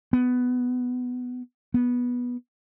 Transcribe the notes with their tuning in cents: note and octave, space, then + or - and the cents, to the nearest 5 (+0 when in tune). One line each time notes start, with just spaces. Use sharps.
B3 +10
B3 -10